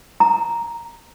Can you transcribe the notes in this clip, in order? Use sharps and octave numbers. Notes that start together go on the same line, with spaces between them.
A#5